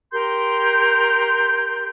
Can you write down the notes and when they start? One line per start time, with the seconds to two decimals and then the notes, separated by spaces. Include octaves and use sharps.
0.12 G4 A#4 C6 G6